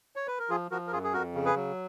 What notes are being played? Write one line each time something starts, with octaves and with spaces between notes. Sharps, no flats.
C#5
B4
A#4
F3 F4 G#4
F3 F#4 A#4
A#4
F#2 F4 G#4
G#4
F2 F#4 A#4
C#3
G#4 B4
F#3